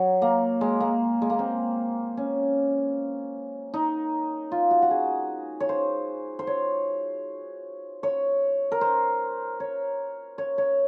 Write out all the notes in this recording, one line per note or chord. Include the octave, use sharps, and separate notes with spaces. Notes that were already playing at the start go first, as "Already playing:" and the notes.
Already playing: F#3
A#3
G#3
A#3
G#3
A#3
C4
C#4
D#4
F4
F#4
F#4
G#4
C#5
C5
C5
C#5
C#5
A#4
C5
C#5
C#5
C#5